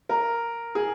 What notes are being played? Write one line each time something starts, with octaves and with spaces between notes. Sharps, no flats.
A#4
G#4